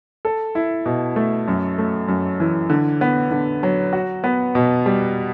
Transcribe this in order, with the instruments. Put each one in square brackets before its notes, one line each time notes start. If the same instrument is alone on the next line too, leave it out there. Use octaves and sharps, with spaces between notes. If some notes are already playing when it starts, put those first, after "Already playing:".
[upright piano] A4
E4
B2
A3
F#2
A3
F#2
E3
D3
B3
D3
F#3
F#4
B3
B2
G3